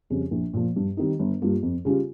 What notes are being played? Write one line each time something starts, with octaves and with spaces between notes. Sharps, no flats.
F2 C#3 G3
A#1
A#2 F3
G2
D#3 G3 C4 D#4
G1
G2 G3 A#3 F4
F2
C#3 G3 C#4 F4